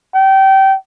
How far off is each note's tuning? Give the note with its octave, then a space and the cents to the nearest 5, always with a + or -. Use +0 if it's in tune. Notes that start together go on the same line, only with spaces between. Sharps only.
G5 -25